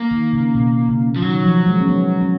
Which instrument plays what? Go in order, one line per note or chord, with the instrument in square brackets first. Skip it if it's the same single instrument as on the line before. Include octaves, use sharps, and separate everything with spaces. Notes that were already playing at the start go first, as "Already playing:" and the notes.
Already playing: [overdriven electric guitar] A#3
[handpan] D#3
C#3
B2
C#3
[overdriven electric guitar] F3
[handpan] D#3 [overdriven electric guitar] F#3
[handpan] F3
G#3
C#4
B3
C#4